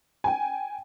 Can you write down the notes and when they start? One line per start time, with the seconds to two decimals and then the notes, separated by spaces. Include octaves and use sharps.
0.24 G5 G#5